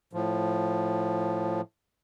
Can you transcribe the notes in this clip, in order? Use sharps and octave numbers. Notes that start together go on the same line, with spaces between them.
A2 F3